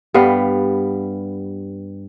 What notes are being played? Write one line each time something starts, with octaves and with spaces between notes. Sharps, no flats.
G2 G3 B3 F5